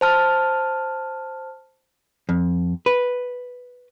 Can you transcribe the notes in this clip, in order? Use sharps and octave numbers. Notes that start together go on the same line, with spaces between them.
C5 A5 F6
F2
B4